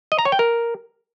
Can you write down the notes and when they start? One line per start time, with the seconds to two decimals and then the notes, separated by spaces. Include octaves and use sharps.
0.12 D#5
0.19 A#5
0.25 C#5
0.32 G5
0.39 A#4